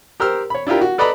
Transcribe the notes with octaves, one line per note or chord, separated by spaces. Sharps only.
G4 A#4 C5 E6 F6
C#5 B5
D4 E4 F4 G4 A#4
F#4
A4 B4 D5 D#5 A#5 B5